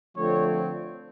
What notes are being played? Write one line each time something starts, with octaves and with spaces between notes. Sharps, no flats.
D3 F3 A3 C4 C#5